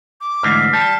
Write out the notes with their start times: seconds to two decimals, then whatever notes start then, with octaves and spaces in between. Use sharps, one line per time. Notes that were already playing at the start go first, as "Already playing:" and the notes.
0.21 D6
0.43 D2 G#2 E3 F6 B6 C7
0.73 G3 A5